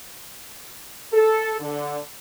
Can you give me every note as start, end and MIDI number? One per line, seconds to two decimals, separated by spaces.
1.12 1.55 69
1.60 1.97 50